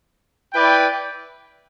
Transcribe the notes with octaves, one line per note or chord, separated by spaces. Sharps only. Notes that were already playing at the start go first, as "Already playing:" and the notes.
E4 B4 D5 G5